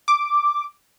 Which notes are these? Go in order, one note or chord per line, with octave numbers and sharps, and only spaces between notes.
D6